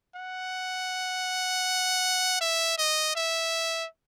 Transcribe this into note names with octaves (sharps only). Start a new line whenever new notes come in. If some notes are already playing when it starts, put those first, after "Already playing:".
F#5
E5
D#5
E5